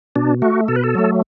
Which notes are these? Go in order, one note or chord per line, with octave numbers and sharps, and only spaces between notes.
B2 D4
A3 F#4
B2 A4
B4
A4
F#3 A3